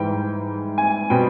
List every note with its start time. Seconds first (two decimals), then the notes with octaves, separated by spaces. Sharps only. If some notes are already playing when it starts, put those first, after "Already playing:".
Already playing: G#2 E3 G3 G5
0.78 G#5
1.10 B2 G3 C4 G5